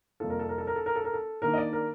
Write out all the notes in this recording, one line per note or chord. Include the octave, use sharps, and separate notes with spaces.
F2 C3 G3 A#3 F4 A4
A#4
A4
A#4
A4
A#4
A4
A#4
A4
A#4
A4
D#3 A#3 D4 A#4
D#5
D5
A#4